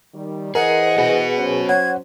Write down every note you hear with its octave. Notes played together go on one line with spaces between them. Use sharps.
D#3 G3
E3 G#4 A#4 C5 D#5 F#5
B3 F#4 G#4 B4
F#3 C#4 C5
C#5 F#5 G#6